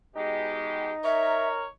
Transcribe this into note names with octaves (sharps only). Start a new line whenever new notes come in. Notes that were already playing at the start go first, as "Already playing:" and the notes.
B2 G#3 D#4 G4
A#4 C#5 E5